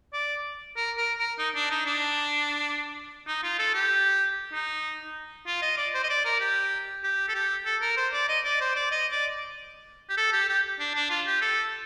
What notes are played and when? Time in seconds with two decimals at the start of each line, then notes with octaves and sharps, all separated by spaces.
0.13 D5
0.76 A#4
0.98 A#4
1.19 A#4
1.38 D#4
1.55 D4
1.71 D#4
1.86 D4
3.27 D#4
3.43 F4
3.59 A4
3.74 G4
4.53 D#4
5.47 F4
5.62 D#5
5.77 D5
5.94 C5
6.04 D#5
6.09 D5
6.25 A#4
6.40 G4
7.04 G4
7.28 A4
7.34 G4
7.65 A4
7.82 A#4
7.97 C5
8.13 D5
8.29 D#5
8.45 D5
8.61 C5
8.75 D5
8.91 D#5
9.12 D5
10.09 G4
10.17 A4
10.33 G4
10.49 G4
10.80 D4
10.95 D4
11.10 F4
11.27 G4
11.41 A4